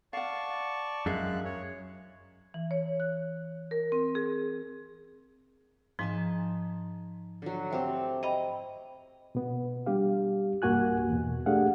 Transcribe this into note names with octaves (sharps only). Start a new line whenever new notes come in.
D5 F5 F#5 A5 C#6
F#2 G#3 G#4 E5 F5 F#6
C#5
E3
C#5
F#6
A#4
C4
G#4
G#2 F3 D#4 G#5 A5
D3 F#3
A3 C4 G4
D#5 G5 A#5 B5
B2 B3
G3 D4 G4 F5
C2 G2 A#3 F#4 G#5 F#6
E2 B2
A3 D4 G4 G#4 F5 F#5